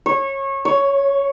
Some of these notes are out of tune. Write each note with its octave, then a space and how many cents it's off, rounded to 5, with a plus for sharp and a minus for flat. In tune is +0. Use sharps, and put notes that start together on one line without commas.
C#5 -25
C#5 +5